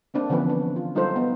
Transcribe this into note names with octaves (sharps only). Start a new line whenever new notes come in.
A#3 C4 D4
D3 E3 F3 B3 C#4 B4
D4
F4
F#3 G3 D#4 F4 A4 C5
B3